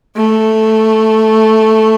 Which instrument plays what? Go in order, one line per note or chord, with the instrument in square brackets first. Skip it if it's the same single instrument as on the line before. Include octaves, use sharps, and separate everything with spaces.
[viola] A3